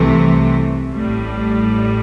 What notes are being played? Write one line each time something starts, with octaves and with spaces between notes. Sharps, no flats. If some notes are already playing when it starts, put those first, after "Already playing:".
Already playing: C2 C3 E3 A3
A1 A2 G3